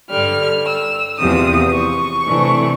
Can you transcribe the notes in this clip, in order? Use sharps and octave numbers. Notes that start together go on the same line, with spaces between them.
G2 D3 G3 F6
E6
E2 C3 F3 D#6
C#6
C3 E3 A3 D4